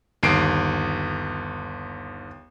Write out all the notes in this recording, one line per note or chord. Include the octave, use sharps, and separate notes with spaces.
G1 D#2 C7 D7